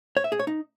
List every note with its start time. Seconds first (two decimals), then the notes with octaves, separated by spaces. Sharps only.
0.17 C#5
0.24 E5
0.32 G#4
0.39 C#5
0.47 D#4